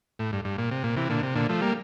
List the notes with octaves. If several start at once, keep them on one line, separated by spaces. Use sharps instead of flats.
A2
G2
G2
A#2
C3
A#2
C3 E3
A#2 D3
C3
A#2 D3
F3 A3
G3 A#3